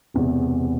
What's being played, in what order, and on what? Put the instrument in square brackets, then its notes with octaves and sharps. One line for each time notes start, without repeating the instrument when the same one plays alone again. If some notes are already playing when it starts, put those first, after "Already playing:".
[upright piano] E1 E2 C3